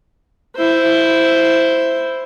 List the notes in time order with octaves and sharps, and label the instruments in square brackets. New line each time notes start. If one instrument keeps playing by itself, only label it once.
[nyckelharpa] E4 C5